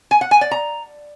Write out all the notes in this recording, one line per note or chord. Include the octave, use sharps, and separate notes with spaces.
G#5
F#5
G#5
D5
A#5